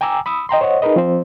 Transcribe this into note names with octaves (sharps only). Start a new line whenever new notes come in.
G5 G#5 A#5 D6 E6
B5 D#6 E6
D#5 G5 A#5 C6
C5 C#5 D#5 F#5
D#4 G#4 A#4 B4 D#5
F3 C4 C5